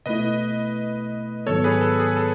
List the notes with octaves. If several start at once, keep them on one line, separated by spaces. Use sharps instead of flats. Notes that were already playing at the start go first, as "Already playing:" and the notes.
B2 A3 E4 B4 D#5
G#2 D#3 F#3 B3 A4 C#5
G#4 B4
A4
G#4
A4